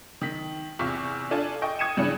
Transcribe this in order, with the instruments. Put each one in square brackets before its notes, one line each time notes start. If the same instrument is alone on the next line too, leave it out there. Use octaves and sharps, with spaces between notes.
[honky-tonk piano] D#3 B6
E2 C3 F4 C#6 B6
D4 F4 A4 G#5 A5
D#5 G5 C#6
D#6 G#6 C#7 D#7 E7
G2 C#3 E3 D4